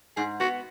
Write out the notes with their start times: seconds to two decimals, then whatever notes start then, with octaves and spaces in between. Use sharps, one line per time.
0.17 G#2 G#4
0.40 B3 F#4